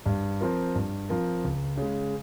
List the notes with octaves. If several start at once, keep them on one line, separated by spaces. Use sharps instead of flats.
G2
F3 C4 F4 A#4
G2
F3 C4 F4 A#4
C#2
C#3 G#3